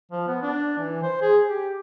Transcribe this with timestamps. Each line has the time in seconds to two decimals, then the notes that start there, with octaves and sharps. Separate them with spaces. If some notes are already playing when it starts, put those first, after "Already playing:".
0.12 F3
0.27 B3
0.42 D4
0.79 E3
1.03 C5
1.22 G#4
1.47 G4